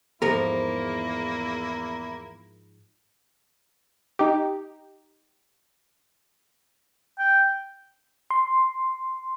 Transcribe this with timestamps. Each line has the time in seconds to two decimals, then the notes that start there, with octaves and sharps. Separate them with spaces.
0.22 E2 G#2 F3 A#3 E4 A#4
4.19 D#4 G4
7.19 G5
8.30 C6